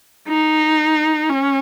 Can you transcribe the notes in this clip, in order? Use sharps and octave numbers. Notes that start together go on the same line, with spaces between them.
D#4
C#4